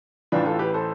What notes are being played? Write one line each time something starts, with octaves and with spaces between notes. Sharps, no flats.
A1 A2 E3 D4 F4
F4 A4
G4 B4
A4 C5